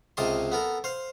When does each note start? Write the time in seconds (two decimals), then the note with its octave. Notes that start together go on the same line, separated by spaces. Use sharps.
0.17 C#2 C3 A#4 D#5 A5 C6
0.52 B3 A4 A#4
0.84 C5 F5